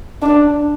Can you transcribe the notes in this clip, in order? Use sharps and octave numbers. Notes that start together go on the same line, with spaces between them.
D4